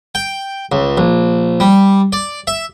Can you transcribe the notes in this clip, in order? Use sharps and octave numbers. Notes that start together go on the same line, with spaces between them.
G5
C#2
A#1
G3
D5
E5